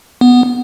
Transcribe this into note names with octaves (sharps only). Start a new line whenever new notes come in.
B3